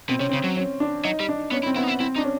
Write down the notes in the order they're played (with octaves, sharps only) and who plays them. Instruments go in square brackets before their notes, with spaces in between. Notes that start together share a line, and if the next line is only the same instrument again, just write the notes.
[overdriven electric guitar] B2 [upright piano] C4
[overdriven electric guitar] C3 [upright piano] C#4
[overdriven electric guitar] C#3 [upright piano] C4
[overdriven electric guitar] F#3
[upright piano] C#4
D4
[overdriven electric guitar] F#3 [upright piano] D#4
[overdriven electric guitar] G3
[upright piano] D4
[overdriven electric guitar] B3 [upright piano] C#4
[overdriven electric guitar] E4
[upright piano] C4
[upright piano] B3 [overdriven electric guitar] E4
[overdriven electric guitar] D#4
E4
[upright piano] C4 [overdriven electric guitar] E4
[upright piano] D4 [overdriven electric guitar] D#4
[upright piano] C#4